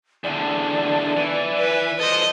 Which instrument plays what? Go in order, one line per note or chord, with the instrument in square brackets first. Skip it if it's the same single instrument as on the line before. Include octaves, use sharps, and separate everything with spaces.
[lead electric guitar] E2 D3 [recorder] D5
[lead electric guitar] E3
[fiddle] B4
[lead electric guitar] A4 C5 [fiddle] D#5